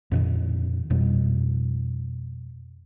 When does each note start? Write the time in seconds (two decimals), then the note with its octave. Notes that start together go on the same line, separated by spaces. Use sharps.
0.12 F2 A#2 D#3
0.90 F2 B2 G3